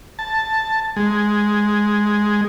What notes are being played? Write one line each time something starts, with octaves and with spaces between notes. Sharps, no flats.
A5
G#3